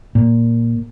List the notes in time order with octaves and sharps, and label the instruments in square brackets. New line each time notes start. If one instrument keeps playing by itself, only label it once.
[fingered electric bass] A#2